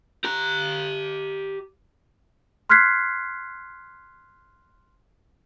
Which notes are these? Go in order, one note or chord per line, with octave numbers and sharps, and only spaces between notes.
G4 A#5
C6 F6 F#6 G#6 B6 C7